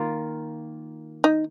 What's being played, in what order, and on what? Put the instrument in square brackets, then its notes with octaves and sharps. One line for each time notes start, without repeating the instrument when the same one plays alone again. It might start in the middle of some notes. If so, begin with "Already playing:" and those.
Already playing: [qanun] D#3 A#3 F4 A#4
[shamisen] D#4